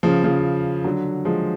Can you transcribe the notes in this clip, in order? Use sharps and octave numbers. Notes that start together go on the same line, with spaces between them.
C#3 F3
C#3 F3
D3 F#3
F3 G#3